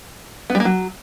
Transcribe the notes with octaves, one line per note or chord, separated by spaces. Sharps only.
B3
G3
A#3
F#3